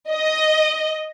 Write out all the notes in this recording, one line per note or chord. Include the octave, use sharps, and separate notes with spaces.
D#5